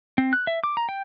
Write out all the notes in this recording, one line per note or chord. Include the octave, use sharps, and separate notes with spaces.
C4
F#6
E5
D6
A#5
G5